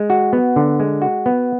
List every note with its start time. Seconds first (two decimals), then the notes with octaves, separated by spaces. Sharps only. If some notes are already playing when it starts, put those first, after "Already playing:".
Already playing: G#3
0.10 F#4
0.33 B3
0.56 D3
0.80 G#3
1.02 F#4
1.26 B3